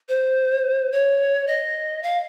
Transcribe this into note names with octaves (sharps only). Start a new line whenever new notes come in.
C5
C#5
D#5
F5